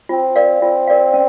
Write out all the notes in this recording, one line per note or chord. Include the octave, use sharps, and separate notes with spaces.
C4 F4
A#4 D5 F5
C4 F4
A#4 D5 F5
C#4